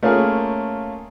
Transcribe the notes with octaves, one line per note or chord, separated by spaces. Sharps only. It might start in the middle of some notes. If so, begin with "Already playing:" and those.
A3 A#3 C#4 F4 G#4 A#4